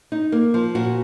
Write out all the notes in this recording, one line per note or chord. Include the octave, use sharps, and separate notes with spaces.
D#4
A#3
F3
A#2 F#4